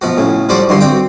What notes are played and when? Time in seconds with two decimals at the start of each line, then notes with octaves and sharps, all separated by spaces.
0.01 B2 F3 F#4
0.17 A2 C#3
0.49 F3 G3 F#4 C5 D5
0.69 G2 D3 F#4 C6
0.80 C4 F#4 G5